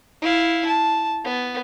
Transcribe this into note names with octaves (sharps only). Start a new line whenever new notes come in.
E4 F5
A5
B3